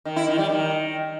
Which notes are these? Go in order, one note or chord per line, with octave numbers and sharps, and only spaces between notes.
D#3
E4
D#3
G3
D#3